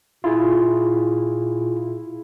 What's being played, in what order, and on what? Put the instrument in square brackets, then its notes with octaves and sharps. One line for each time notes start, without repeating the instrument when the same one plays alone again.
[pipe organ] A#2 [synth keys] E4 [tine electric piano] F4 G#4